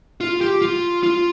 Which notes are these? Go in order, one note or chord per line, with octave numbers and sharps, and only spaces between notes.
F4
G4
F4
F4